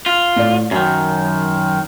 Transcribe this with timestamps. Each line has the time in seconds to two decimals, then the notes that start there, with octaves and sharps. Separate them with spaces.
0.06 F4
0.36 A2 D5
0.71 F#2 D#3 F#3